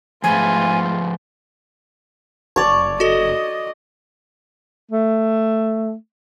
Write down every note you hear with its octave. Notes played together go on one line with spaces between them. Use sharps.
G#2 F3 A3 F4 G#4 B4 G#5
F#1 C#5 D5 A5
F#4 A4 D#5
A3